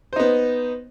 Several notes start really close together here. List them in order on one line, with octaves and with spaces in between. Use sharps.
C5 D#4 B3